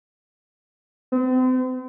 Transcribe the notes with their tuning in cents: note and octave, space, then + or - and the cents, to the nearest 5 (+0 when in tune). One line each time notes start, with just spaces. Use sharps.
C4 -40